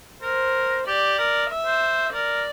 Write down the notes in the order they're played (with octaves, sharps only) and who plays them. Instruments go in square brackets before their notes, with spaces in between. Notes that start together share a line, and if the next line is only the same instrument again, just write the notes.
[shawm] A#4 [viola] C5
[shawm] G4 [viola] D5
[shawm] A#4
[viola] E5
[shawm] C5
[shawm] A#4 [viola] D5